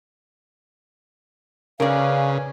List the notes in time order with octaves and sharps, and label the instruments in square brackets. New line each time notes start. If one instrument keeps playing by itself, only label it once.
[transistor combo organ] C#3 [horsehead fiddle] C#4 B4 [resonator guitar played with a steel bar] A#4 D5 [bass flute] F5